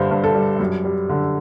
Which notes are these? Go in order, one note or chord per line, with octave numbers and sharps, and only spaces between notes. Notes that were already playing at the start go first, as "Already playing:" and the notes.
Already playing: G2 D3 G3 C5
G2
A4
G3
F#2
G3
D3